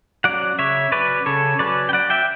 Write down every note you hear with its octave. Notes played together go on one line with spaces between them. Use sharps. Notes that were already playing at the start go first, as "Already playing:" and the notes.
F#3 C#4 D5 F#5
C#3 C#5 E5
F#3 C#4 B4 D5
C#3 A4 C#5
F#3 C#4 B4 D5
G5
F#3 D5 F#5
E5 G5